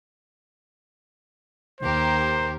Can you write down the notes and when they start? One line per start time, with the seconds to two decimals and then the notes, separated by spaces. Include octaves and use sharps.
1.80 D#2 G4 A#4 C5